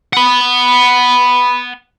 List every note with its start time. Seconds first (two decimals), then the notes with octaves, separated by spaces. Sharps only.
0.13 F#5 B5